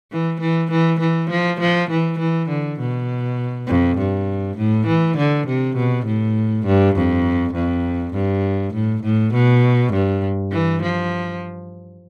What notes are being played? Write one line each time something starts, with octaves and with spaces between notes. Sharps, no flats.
E3
E3
E3
E3
F3
F3
E3
E3
D3
B2
F2
G2
A2
E3
D3
C3
B2
A2
G2
F2
F2
G2
A2
A2
B2
G2
E3
F3